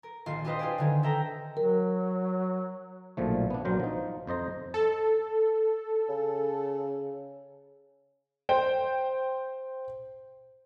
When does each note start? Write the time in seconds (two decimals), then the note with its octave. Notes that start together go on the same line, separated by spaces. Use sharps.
0.03 A#4
0.26 A#1 D#3 F4 C7
0.44 D4 F4 G4 B4 C5 D#5
0.59 F4 G4 G#4 C5 D5
0.78 D3 D#3 G#4
1.03 A4 E5 G5 A#5
1.57 F#3 A#4
3.17 B1 A#2 F3 A3
3.50 B3 D4
3.65 A#1 F#3 A#4 C5 G5
3.80 F3 D#4
4.27 F2 C5 D#5 A#5
4.74 A4
6.09 C#3
8.49 C5 G5